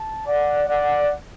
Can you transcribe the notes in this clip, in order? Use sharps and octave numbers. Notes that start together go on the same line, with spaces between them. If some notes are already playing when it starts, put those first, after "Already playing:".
Already playing: A5
D5 F#5
D5 F#5